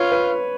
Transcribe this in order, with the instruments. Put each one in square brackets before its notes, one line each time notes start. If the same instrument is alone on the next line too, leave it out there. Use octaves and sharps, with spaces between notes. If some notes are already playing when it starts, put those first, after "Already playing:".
Already playing: [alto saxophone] F4 [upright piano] B4 C#5
[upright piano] B4